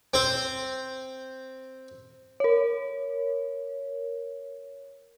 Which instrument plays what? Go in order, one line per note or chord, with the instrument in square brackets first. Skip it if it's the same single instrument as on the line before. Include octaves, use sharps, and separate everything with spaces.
[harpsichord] C4 C5
[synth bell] A#4 C#5